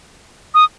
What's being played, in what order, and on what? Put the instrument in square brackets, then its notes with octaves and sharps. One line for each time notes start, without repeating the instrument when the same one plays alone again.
[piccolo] D#6